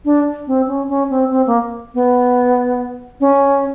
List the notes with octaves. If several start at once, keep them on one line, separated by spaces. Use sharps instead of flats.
D4
C4
C#4
C#4
C4
C4
A#3
B3
C#4